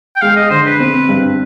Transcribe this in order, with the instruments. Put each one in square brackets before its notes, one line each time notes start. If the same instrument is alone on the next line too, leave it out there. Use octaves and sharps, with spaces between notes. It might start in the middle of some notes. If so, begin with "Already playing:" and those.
[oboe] G5
[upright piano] G#3 [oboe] F5
[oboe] D#5
[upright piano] D3 [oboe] C5
[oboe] B4
[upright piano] C4
G2